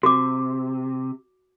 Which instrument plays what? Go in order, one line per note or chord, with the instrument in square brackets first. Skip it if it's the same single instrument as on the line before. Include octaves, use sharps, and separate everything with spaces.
[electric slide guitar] C3 [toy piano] F#4 D6